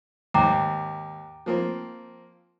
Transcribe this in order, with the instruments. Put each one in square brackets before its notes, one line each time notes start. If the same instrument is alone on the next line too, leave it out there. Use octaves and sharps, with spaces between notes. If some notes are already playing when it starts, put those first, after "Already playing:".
[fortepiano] D#2 G#2 [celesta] G5 A#5 D6
[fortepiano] F3 A#3 C4